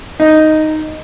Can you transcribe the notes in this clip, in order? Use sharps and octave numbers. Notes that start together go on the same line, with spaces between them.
D#4